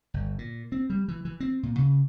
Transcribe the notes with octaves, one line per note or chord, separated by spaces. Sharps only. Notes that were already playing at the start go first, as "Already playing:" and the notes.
G1
A#2
C4
G3
E3
E3
C4
A#2
C#3